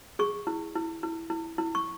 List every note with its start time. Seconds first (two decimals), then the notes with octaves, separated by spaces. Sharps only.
0.19 G#4 C#6
0.47 E4
0.75 E4
1.03 E4
1.30 E4
1.58 E4
1.75 C#6